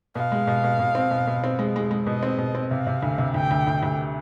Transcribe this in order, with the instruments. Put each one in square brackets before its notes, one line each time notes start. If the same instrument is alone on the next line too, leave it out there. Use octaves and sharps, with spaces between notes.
[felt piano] B2 [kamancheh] F5
[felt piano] G#3
B2
B2
B2
C4
B2
B2
C4
G#3
G#3
G#3
[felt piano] B2 [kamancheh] D#5
[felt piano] C4
B2
C4
[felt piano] C3 [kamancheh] F5
[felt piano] C3
D2
C3
[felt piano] D2 [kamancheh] G5
[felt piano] D2
D2
D2